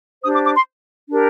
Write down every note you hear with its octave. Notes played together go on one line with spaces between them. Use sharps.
D4 G4 C5 D#6
D6
D6
C6
D4 G4 A#4